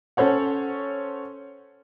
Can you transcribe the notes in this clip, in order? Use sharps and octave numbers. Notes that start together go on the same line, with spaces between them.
C#4 A4 C5 C#5 F#5